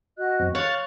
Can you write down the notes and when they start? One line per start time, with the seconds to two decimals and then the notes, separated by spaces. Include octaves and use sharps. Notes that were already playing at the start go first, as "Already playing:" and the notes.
0.18 F#4 D#5 F#6
0.39 F#2 C4
0.55 C#5 F5 F6 F#6 A6